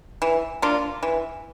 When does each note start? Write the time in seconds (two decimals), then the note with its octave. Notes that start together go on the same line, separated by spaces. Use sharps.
0.22 E3
0.62 A#3 D4 F4
1.03 E3